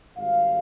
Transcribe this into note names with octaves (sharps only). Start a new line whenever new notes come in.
G#1 G#2 G3 F5